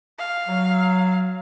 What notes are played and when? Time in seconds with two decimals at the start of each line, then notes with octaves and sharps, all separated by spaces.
0.19 F5
0.48 F#3